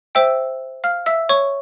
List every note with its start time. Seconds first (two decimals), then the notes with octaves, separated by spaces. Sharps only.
0.15 C5 E5 G5 E6
0.84 F5 F6
1.06 E5 E6
1.29 C#5 C#6